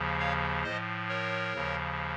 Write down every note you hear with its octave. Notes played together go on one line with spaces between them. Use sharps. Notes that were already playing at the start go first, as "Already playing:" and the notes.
Already playing: D#2 C#3 F3
C#5 F5
A2 F3 C5 D#5
A#4 C#5
D#2 C#3 F3